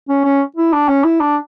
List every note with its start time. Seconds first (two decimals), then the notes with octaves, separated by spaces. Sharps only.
0.09 C#4
0.25 C#4
0.56 E4
0.73 D4
0.89 C#4
1.04 E4
1.20 D4